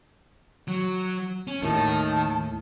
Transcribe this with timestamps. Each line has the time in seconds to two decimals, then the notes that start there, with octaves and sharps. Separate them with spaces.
0.68 F#3
1.47 C#4
1.62 D#2 A2 D#3 A5